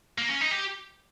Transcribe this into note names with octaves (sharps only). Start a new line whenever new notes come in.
A#3
C#4
D#4
G4